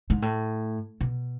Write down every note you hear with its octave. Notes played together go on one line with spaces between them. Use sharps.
G#2
A2
B2